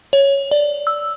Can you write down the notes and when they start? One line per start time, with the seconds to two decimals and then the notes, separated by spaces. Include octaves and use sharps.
0.13 C#5
0.51 D5
0.87 E6